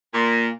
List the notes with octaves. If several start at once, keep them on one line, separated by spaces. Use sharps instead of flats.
A#2